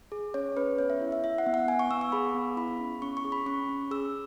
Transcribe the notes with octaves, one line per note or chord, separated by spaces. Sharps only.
G#4
C#4 C#5
C#4 B4
B3 C#5
E5
E4
E5
E4 E5
F#5
B3
F#5
B3 G#5
C#6
B3 E6
C#6
G#4 B5
B3
E4 B5
C#4
C#4 C#6
C#6
G#4
B5
C#4 C#6
C#4
G#4 E6